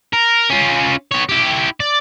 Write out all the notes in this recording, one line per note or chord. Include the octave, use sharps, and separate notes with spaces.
A#4
C#4 F4
B3 C#5
E4 G4
D5